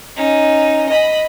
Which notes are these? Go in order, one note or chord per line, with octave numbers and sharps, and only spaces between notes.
C#4 D#4
D#5 B5